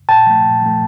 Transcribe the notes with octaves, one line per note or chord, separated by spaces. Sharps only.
A#2 G5 A5
F3 A3
A#2
F3 A3